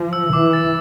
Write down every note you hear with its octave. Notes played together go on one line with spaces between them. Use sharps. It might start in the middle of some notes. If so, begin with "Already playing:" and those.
Already playing: F3
E6
E3 D6
A6